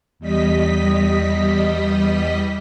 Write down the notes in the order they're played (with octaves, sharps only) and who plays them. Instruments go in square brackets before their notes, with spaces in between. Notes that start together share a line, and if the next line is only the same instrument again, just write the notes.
[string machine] E2 G3 D#5 B6